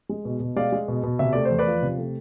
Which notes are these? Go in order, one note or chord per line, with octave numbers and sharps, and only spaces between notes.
G#3
B2
B2
G#3 D5 F5
G#3
B2
B2
C3 E5
A3 D5
C5
E2
B4 D5
F3
C3
A3